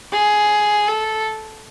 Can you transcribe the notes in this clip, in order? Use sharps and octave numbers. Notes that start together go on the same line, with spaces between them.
G#4
A4